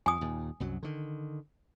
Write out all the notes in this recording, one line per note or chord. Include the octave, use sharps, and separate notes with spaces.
F2 G#5 D#6
D#2 A#2
C2 F#2 F#3
D3 D#3